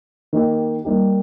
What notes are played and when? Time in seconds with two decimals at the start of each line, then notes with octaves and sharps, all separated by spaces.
0.33 D#3 A#3 D#4 G4
0.84 G3 A#3 D#4 G4